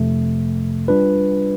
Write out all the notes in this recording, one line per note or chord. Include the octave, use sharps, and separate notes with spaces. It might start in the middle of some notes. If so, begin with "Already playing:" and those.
Already playing: F2 C3 F3 A3
G3 D4 F4 B4